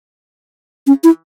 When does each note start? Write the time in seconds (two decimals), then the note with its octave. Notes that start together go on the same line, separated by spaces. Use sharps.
0.87 C#4
1.04 E4